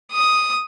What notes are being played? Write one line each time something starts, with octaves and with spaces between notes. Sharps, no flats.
D#6